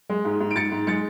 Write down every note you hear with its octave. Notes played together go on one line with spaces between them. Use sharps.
G#3
G#2
G#2
D7
G#2 A6 C#7
G#2
G#3 A6 C#7